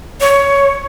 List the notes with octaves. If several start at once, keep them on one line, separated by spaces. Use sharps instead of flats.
C#5